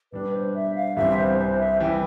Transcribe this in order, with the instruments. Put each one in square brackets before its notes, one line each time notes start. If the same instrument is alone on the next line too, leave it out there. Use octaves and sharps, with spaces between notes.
[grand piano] B2 G3 D4 [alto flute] B4
[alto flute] C5
E5
F5
[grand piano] C2 C3 E3 G3 C4 [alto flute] E5
[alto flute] C5
C5
E5
[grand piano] E3 G3 [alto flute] G5